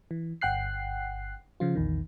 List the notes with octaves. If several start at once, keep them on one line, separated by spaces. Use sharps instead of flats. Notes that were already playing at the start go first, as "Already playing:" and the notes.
E3
G1 F#5 G5 F#6 C7
C#3 F3 F4
A#1 E2 D#3